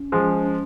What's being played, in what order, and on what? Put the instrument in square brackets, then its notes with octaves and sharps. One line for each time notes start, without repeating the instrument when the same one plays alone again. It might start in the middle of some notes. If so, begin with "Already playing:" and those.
Already playing: [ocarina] C#4
[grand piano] F3 G#3